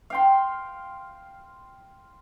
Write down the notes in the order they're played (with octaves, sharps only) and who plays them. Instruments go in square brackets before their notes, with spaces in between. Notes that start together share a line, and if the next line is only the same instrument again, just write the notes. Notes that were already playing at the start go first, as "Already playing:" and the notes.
[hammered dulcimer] F5 G5 C6